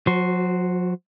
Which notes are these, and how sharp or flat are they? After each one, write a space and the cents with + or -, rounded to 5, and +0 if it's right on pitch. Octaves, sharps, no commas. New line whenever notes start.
F#3 -45 F#4 +0 C5 +0